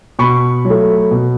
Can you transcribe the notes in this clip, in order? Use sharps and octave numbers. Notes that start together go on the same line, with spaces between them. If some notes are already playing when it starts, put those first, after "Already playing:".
B2 B5 C#6
F#3
A3
B2